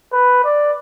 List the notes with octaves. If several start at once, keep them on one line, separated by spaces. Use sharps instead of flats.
B4
D5